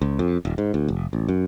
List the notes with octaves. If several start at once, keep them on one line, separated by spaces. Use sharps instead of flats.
C#2
F2
D#1
G#2
D2
F1
A1
F#2